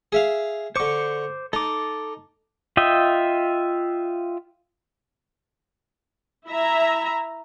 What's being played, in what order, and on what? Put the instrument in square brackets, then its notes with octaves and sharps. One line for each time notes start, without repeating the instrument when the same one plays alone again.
[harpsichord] G#4 E5 F5
[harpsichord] D3 C#6 [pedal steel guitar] C5 D6
[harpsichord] D#4 [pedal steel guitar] A4 D6
[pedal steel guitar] F4 D#5 E5 G5
[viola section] E4 E5 A#5